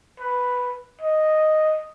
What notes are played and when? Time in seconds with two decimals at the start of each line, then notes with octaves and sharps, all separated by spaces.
0.20 B4
1.01 D#5